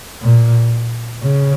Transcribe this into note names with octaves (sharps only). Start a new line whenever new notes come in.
A#2
C#3